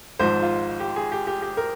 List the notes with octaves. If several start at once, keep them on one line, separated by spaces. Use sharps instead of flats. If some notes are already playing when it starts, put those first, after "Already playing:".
G#1 G#2 F3 C5
F4
G4
G#4
G4
G4
G4
A#4